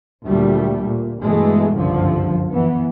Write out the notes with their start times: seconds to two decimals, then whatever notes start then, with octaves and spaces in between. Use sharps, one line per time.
0.24 D2 A#2 G3 A3
0.86 A#2
1.22 G2 B2 E3 G#3 A3
1.75 F#1 C2 G2 D3 F3
2.52 E3 B3